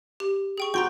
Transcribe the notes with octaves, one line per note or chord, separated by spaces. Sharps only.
G4
G#4 G5 C#6
F#4 G5 A#5 C6 C#6